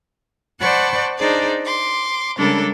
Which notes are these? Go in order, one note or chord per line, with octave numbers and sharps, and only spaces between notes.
C5 D5 F#5 A5 B5 C#6
D4 D#4 G#4 C5 D5
C6 D6
C#3 G3 G#3 D4 A4 A#4